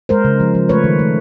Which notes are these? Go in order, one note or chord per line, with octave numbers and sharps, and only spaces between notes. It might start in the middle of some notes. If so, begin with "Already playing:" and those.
G#3 A#4 C5
C#3
F3
F3
A3 B4 C#5
D#3
A3